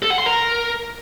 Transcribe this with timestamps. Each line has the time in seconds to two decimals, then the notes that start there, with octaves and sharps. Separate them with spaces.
0.02 A4
0.10 F#5
0.18 C6
0.26 A#4